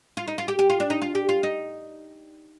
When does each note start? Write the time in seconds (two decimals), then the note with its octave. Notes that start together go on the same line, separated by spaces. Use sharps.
0.17 F4
0.28 D#4
0.38 F4
0.48 G4
0.59 G4
0.70 F4
0.80 D4
0.90 D#4
1.02 F4
1.15 G4
1.29 F4
1.43 D#4